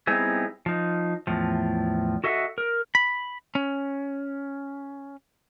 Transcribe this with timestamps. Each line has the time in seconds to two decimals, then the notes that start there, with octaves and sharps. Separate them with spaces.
0.07 G3 B3 C4 D#4 E4 G#4
0.66 F3 D#4
1.27 E2 A2 F3
2.24 F#4 A4 D#5 E5 F#5
2.58 A#4
2.95 B5
3.55 C#4